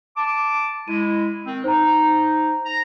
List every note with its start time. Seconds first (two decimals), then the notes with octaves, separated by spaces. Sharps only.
0.16 A5 D6
0.88 G#3 E4 D#7
1.45 D#3 C4
1.64 D#4 C5 A#5
2.65 A#5